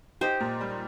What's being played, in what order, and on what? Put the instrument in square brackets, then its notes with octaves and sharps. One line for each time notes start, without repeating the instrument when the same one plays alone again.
[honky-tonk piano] D#4 [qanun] G4 C5
[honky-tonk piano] A#2
G3